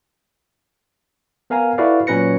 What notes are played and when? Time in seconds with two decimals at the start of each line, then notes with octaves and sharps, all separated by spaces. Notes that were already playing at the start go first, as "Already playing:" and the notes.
1.50 B3 A#4 F5 G#5 A#5
1.78 E4 F#4 A4 B4 D5 F5
2.07 A#2 F#3 C#4 B4 A#6 C#7